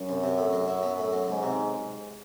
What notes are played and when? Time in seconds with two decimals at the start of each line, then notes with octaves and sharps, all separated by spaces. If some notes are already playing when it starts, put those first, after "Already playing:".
Already playing: F#2
0.09 C2
0.23 C3
0.38 A2
0.53 F#3
0.68 E4
0.83 B3
0.98 A2
1.13 F#3
1.28 C#2 G#2
1.43 C3